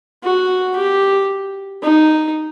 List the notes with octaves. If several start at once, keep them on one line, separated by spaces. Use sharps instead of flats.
F#4
G4
D#4